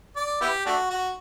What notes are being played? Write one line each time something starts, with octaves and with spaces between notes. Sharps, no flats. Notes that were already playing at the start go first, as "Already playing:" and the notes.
D5
B3 E4 G4
A3 D4 F#4
F#4